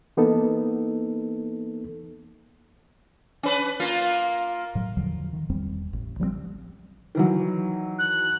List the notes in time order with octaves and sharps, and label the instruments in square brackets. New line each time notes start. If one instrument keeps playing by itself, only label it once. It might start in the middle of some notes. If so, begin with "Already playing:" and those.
[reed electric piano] E3 A#3 B3 D#4 A4
[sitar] C#4 B4
A#3 F4
[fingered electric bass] A2 F#3
E2 D3 F3 F#3
D#3
E1 E2 G3 C4
A1
F3 G3 A3 C4
[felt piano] D#3 E3 F#3
[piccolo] F#6